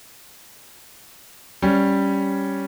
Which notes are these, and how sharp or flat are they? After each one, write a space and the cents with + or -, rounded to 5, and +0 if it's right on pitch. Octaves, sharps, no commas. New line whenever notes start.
G3 +0 C#4 +0